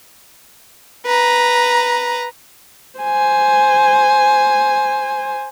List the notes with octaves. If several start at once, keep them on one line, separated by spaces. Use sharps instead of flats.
B4 A#5
C5 G#5